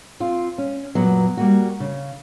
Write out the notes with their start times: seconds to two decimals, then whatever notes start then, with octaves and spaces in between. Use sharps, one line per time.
0.20 C4 F4
0.58 C#4
0.95 F#2 A#2 F#3 B3
1.37 G3 A#3 F#4
1.80 C#3